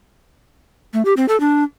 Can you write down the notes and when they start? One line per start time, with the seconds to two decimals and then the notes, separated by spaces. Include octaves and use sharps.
0.93 A3
1.05 G4
1.17 C4
1.28 A4
1.40 D4